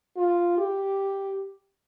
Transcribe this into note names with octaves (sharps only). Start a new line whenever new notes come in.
F4
G4